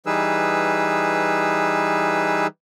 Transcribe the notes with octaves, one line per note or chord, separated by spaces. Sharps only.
E3 G3 D#4 G#4 B4 E6